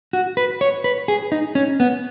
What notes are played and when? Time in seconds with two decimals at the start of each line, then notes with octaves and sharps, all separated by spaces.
0.13 F#4
0.37 B4
0.61 C#5
0.84 B4
1.08 G#4
1.32 D#4
1.55 C#4
1.80 B3